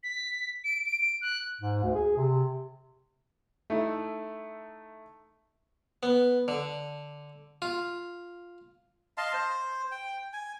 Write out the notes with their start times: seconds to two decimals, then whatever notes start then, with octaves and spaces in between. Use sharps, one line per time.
0.03 B6
0.64 D7
0.86 D7
1.21 F#6
1.61 G#2
1.83 D2
1.95 G#4
2.17 C3
3.70 A3 D#4 E4
6.03 B3
6.48 D3
7.62 F4
9.18 D#5 F5 A5 C6
9.34 C5
9.92 G5
10.33 G#5